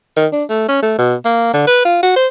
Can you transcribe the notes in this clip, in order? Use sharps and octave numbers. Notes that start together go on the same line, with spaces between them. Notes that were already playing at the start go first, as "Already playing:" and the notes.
D#3
D4
A3
C#4
A3
B2
A#3
D3
B4
F4
F#4
C5